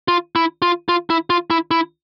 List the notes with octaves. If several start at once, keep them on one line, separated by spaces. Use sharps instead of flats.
F4
E4
F4
F4
E4
F4
E4
E4